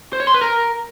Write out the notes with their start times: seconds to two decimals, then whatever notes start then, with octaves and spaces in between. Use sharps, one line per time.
0.13 C5
0.20 C#5
0.27 C6
0.34 B4
0.41 A#4